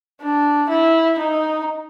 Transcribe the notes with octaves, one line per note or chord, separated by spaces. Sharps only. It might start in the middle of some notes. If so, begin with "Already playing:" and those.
D4
E4
D#4